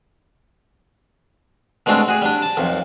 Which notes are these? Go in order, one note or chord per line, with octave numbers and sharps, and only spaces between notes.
B2 G#3 A3 C4 D4 A4
F#4 G#4
G3 D4
A5
B1 F2